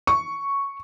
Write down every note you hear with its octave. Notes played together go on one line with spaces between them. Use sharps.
C#6